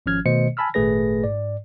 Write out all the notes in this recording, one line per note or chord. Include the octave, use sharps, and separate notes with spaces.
G#1 F3 C#4 F6 G#6
B2 D#3 A3 C5 D#5 C#7
G#5 A5 B5 E6 F6
G#1 A#2 A3 G#4 B4 A#6
G#2 D5